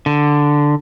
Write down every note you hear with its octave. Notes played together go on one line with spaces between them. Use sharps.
D3